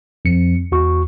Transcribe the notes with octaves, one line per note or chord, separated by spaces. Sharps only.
F2 C#7
E2 F#4 C#6